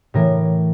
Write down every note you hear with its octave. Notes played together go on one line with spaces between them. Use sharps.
A2 E3 A#4